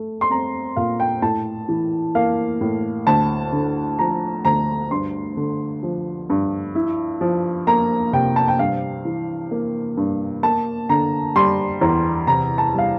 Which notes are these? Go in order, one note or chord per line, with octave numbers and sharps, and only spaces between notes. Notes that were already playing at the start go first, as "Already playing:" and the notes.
Already playing: A3
C6
C4 A#5
A#2 F5
G5
A2 A5
E3
A#3 F5
A2
D2 A5
D3
F3 A#5
D2 A#5
G2 C6
D3
F3
G2
E4
F3
A#3 A#5
C3 G5
A5
G5
G2 F5
E3
A#3
G2
A#3 A5
D3 A#5
G3 C6
E2 A#5
C3 A#5
A5
G3 F5